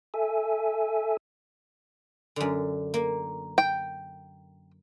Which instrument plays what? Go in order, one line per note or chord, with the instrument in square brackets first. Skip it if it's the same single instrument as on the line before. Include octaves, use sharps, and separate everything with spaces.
[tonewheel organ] A4 E5 G#5
[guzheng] F#2 D3
A#3
[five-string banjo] G5